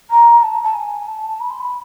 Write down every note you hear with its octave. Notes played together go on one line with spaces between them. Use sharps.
A#5
A5
A5
G#5
A5
B5
C6
B5